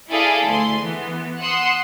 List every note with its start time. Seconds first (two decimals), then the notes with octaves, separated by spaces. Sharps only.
0.11 E4 G#4 A4 D5 F5
0.47 D2 C6
0.79 E3 B3
1.41 F#5 C6 D#6 E6 F#6